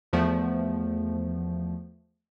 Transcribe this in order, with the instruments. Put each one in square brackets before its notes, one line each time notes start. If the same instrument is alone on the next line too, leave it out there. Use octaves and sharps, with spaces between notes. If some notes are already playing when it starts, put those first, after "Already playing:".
[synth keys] E2 F3 A3 B3